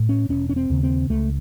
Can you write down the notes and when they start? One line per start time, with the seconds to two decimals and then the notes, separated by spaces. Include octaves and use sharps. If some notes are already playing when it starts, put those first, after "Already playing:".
Already playing: A2
0.09 C#4
0.29 E1 C#4
0.49 C#4
0.56 C4
0.70 D#2 C#3
0.83 C4
1.09 C#2 A3